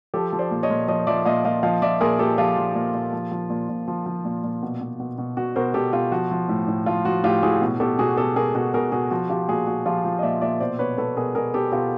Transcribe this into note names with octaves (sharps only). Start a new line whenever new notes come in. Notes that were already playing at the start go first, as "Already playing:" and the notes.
F3 G4 A4
F3
C5 D5
A#2
C#5 D#5
A#2
F3 C#5 D#5
F3 D5 E5
A#2 D#5 F5
A#2 D#5 F5
F3 D#5 F5
F3 D5 E5
A#2 G#4 A#4
A#2 G4 A4
F3 F4 G4
F3
A#2
A#2
F3
F3
A#2
A#2
F3
F3
A#2
A#2
B2
B2
B2
B2
B2 F#4
B2 A#4 C5
B2 G4 A4
B2 F4 G4
F3 F#4
F3
A2
A2
F3 F4
F3 F#4
A2 F4 G4
A2 F#4 G#4
B2
B2 G4 A4
B2 F#4 G#4
B2 G4 A4
B2 G#4 A#4
B2 F#4 G#4
B2 G#4 A#4
B2 F#4 G#4
F3 F#4
F3 F4 G4
A#2 F#4 G#4
A#2 F#4
F3 F4 G4
F3
D#5
A#2 D5 E5
A#2 D5 E5
B2 C5 D5
B2 B4 C#5
B2 A4 B4
B2 G#4 A#4
B2 G#4 A#4
B2 G4 A4
B2 F4 G4